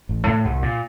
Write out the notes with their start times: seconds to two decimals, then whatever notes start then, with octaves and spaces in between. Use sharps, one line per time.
0.09 A1
0.27 A2
0.45 C2
0.62 A#2